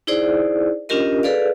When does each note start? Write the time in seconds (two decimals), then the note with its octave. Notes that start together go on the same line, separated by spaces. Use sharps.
0.07 D#4 E4 G#4 C5 D5
0.89 C#4 D4 F4 G4 A#4 D#5
1.23 G#4 A4 B4 D5 F5